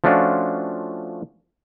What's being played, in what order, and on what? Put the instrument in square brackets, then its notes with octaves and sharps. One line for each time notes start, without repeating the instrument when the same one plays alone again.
[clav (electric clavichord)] F3 A3 C#4 D4 F4 F#4